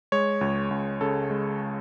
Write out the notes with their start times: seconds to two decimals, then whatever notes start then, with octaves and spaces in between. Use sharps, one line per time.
0.12 G#3 C#5
0.41 C#2
0.71 C#2
1.01 C#3 A4
1.30 G#3